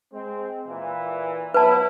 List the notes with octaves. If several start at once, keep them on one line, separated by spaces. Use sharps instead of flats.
G#3 C4
A#2 E3
F#3 B3 E4 B4 A5